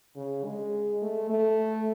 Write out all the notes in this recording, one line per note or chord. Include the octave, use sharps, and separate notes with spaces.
C#3
G#3
A3
A3